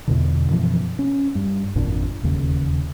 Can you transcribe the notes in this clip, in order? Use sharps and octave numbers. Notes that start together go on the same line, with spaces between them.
E2 B2 D3
F#2 B2 E3 F3
C#4
G2
G#1 F2 A#2 D4
E1 D#2 C#3